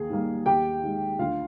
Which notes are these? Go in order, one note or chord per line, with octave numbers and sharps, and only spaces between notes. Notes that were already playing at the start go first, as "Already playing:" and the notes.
Already playing: D#2 G#4
D#3 G3 A#3
D#2 G4 G5
D#3 G#3
D2 F4 F5